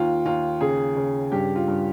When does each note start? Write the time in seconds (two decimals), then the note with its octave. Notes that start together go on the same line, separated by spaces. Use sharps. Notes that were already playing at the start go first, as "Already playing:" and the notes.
Already playing: D#2 F4
0.25 D#2 F4
0.61 C#3 G#4
0.96 C#3
1.32 G2 G4
1.56 F4
1.68 G2